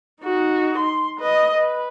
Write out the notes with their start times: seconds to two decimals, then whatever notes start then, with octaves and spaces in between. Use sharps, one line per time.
0.23 D#4 F#4
0.78 C6
1.18 B4 D#5
1.55 B4